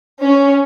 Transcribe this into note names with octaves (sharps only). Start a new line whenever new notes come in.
C#4